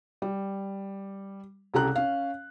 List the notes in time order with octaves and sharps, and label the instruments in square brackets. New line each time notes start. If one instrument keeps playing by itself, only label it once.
[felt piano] G3
C2 C#3 G4 A4 A#5 F#6
C#4 F5